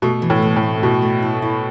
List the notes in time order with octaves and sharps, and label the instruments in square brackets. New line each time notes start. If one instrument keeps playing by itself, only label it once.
[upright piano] B2 [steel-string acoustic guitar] A3
[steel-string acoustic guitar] E3
[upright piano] A2
[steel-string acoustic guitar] A3
[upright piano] A2
[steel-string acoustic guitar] C4
[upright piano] B2 [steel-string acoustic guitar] E4
[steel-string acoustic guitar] A3
E4
E4